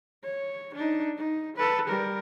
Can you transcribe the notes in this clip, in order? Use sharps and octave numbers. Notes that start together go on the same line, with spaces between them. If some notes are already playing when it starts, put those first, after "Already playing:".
C#5
D4 D#4
D#4
A4 B4
G3 A#4